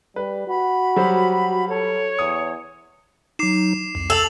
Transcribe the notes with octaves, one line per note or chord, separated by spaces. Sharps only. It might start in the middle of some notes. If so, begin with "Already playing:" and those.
G3 B4
F#4 B5
F#3 G3 C5
A4 C#5
E2 D#6
F#3 D#4 D6 C7 E7
C2 F2
A4 E6 F7 F#7